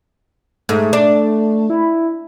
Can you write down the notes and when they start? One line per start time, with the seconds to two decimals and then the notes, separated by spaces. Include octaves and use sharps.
0.69 G#2 A3
0.93 D4
1.70 E4